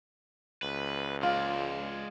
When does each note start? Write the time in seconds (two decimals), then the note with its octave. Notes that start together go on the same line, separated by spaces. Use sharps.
0.62 C#2 B4
1.23 G#3 F4 D5